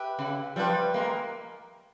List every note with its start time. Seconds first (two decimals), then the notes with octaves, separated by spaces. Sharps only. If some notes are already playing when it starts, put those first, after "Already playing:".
Already playing: G4 B4 E5
0.19 C#3
0.56 F3 G3 G4 B4 E5
0.94 G#3 A#3